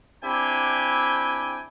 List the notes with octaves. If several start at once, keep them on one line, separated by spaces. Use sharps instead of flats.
C4 D4 E4 G4 G5 G#5